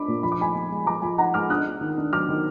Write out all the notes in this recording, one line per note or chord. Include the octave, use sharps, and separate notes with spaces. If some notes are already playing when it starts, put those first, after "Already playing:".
Already playing: D4 B5 D6
A#2
F3 B5
D6
D#4 G#5 B5
F3
G#3
F3 A#5 D6
F3 G#5 B5
D#4 F#5 A#5
G#3 D6 F6
D4 D#6 F#6
D4
D#3
D4
F#3 D6 F6
D#3